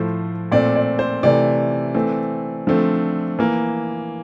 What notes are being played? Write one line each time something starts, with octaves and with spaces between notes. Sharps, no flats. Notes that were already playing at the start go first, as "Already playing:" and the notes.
Already playing: A2 F3 A3 C5
A#2 A3 C4 D5
D5
C5
C3 E3 A3 D5
E3 A3 C4
D3 F3 A3 C4
E3 A#3